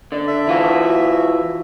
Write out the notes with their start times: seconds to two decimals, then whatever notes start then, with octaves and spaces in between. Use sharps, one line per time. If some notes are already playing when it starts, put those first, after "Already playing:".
0.12 D3 D5
0.28 E5
0.47 E3 F4 F#4